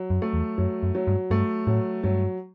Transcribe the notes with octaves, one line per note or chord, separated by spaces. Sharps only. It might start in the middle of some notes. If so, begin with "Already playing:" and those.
Already playing: F#3
F#2
A3
E2
F#2 F#3
F#2
F#3
G2
G2 A3
A2 F#3
G2 F#3